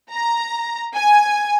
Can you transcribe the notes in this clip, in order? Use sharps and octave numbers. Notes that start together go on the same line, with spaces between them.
A#5
G#5